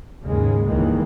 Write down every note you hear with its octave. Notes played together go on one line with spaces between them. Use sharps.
D#2 G#2 C#3 G#3 A#3
C#2 G2 D#3 E3 G#3 A#3